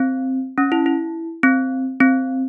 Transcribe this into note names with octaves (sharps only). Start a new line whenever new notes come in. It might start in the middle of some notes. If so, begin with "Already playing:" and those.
Already playing: C4
C#4
E4
E4
C4
C4